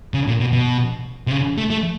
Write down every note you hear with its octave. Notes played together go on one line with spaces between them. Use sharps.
C#3
A#2
B2
B2
C3
C#3
A3
A3